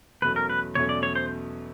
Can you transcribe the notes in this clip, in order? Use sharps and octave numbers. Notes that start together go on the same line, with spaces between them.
E2 B2 F#3 A3 C#4 B4
A#4
B4
E2 B2 F#3 A3 C#4 C#5
D5
C#5
C5